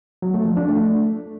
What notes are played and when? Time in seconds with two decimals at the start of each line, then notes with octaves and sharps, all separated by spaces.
0.22 F#3
0.34 A3
0.45 F3
0.57 D4
0.68 A3